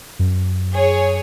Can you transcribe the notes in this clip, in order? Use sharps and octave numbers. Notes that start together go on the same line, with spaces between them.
F#2
G#4 C#5